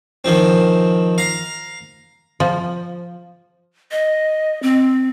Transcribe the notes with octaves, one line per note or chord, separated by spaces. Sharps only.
D#3 F3 C4
F5 A#5
F3
D#5
C4